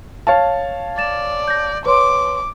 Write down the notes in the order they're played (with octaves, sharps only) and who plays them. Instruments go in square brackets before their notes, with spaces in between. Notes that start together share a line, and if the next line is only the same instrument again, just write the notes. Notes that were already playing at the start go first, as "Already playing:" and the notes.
[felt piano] C#5 F5 A5
[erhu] D5 [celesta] A6 E7
[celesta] G6 A#6
[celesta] B4 C#5 C6 [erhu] D6